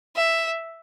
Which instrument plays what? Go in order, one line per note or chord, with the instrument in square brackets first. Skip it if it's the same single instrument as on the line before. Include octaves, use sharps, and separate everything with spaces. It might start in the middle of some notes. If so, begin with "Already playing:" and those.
[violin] E5